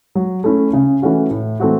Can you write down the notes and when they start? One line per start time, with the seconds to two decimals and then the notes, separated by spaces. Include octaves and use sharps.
0.15 F#3
0.44 A3 C#4 E4
0.73 C#3
1.02 E3 A3 C#4 F#4
1.31 A2
1.60 E3 A3 C4 F#4